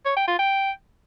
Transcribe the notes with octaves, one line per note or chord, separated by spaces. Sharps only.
C#5
G5
F4
G5